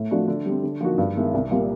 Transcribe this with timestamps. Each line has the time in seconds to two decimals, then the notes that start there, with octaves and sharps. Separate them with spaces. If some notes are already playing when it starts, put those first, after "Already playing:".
Already playing: A2
0.11 F3 A3 D4 F#4
0.28 D3
0.46 G3 C4
0.64 D3
0.81 F3 A#3 D#4 F#4
0.98 G2
1.16 D#3 G#3 B3 E4
1.34 C2
1.51 A#2 G3 C4 F4